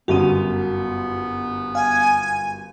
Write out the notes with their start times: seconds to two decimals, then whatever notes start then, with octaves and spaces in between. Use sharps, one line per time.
0.08 G1 F#2 B3 F#4 D#7
1.75 F5 G#5